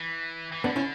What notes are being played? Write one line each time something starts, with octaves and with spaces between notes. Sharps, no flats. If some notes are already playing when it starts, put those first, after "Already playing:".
Already playing: E3
E3
D3 B3 D4
C#4 E4